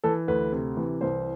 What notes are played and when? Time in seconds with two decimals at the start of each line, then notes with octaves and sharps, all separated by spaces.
0.04 E3 A4
0.28 D2 B4
0.52 C3
0.77 E3
1.01 C2 C5